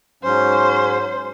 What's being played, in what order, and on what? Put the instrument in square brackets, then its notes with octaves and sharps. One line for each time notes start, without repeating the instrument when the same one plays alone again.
[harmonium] G#2 F#3 C#4 [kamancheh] C5